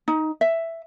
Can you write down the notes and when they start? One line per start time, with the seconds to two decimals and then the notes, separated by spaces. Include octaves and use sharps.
0.08 D#4
0.41 E5